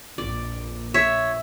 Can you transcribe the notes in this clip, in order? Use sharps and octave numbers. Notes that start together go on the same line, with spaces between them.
A#1 F2 A#2 D5
C#5 E5